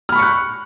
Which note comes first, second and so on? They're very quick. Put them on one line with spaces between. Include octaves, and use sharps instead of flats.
F6 B5 C#6 C#7 F#6